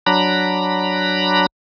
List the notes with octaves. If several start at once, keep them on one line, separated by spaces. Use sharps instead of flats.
F#3 D4 A#5 B5